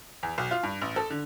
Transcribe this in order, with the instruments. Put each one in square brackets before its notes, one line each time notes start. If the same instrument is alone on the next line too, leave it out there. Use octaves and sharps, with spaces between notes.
[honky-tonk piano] E2
B1
F4
G2
A1
A4
D3